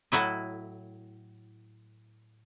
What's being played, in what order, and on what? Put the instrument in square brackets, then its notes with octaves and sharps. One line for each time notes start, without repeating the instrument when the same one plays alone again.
[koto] A2 F#3 E4 D#5